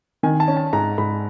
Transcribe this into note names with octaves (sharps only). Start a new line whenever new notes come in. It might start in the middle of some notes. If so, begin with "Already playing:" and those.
D#3 G#5
A5
C#4
A5
G#2 A#5
G#2 B5